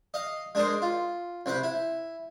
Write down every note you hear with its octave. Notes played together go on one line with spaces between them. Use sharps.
D#5 F5
G#3 D4 G#4 A#4 C5
F4
C2 C4 F#5 B5
E4